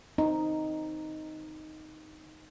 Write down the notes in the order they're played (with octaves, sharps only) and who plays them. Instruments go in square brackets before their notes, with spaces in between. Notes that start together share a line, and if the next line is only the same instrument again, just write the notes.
[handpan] C4 D#4